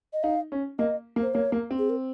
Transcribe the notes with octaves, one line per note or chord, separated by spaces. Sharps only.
D#5
D#4 F5
C#4
A#3 D#5
A#3
C5
A#3 C#5
A#3
C4
G#4
A#4